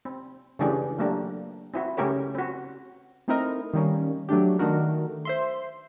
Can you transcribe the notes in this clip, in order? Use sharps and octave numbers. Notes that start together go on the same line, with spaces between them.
C4
C#3 E3 A3 D4 G4 G#4
F#3 A3 A#3 D4 G4
C4 E4 F#4
C#3 A3 C#4 G4 A#4 C#5
C4 F#4
A3 C4 D#4 E4 A#4 D#5
D#3 G3 A#3 C#4
F#3 A3 D4 G4
D#3 A3 D4 F#4 A#4
C5 E5 C6